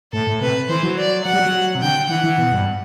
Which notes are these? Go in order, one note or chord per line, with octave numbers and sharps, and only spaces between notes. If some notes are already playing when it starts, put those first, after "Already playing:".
A2 A4
A2
C3 B4
E3 C5
F#3
D5
F#3 F#5
G3
F#3
C3
D3 G5
E3 F#5
E3
B2
G2